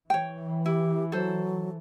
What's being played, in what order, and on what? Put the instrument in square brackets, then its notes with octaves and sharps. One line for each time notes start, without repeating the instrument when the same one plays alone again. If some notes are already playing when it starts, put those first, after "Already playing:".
[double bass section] E3 [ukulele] C#5 G5
[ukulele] E4 [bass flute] G4
[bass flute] F#3 [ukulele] A4 C5